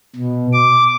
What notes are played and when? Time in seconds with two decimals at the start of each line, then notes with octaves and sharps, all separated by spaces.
0.16 B2
0.53 D6